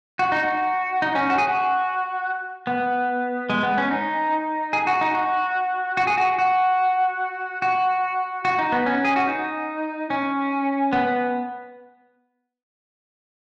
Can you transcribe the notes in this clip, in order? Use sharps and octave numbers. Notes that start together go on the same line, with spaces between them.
F#4
D#4
F#4
D#4
C#4
F#4
G#4
F#4
B3
G#3
B3
C#4
D#4
G#4
F#4
D#4
F#4
F#4
G#4
F#4
F#4
F#4
F#4
D#4
B3
C#4
G#4
F#4
D#4
C#4
B3